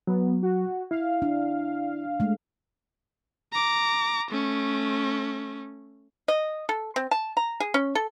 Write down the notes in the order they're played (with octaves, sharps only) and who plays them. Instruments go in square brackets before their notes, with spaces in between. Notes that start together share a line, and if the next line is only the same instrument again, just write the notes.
[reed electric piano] F#3 [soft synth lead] B3
[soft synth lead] F#4
[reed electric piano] E4 [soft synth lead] F5
[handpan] D4
G#3 A3
[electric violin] A#5 D6
A3 C#4
[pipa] D#5
A4
C4
A5
A#5
G#4
C#4
A4